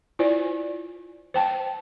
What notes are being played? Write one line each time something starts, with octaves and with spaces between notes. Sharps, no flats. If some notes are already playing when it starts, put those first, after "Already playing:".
E4 F4 C5 D5 G#5
C5 G5 A5